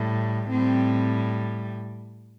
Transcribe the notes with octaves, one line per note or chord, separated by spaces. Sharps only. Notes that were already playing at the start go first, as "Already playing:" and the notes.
Already playing: A2 G3
A2 G3 C4